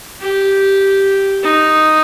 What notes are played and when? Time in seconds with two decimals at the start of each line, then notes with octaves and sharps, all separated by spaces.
0.20 G4
1.43 D#4